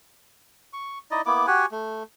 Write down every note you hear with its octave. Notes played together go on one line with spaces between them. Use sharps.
C#6
D#4 E4 D5 D#5
A#3 B3 E4 D6
F#4 G4 F#5 G#5
A3